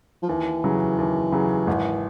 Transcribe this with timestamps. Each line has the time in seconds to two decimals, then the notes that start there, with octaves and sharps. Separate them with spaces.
0.22 F3
0.29 D#2 E3
0.64 C#3 F#3
0.98 D#2
1.32 C#3 F#3
1.67 G#1